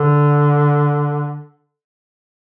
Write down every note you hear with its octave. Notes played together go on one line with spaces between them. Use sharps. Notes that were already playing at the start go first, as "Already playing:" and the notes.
Already playing: D3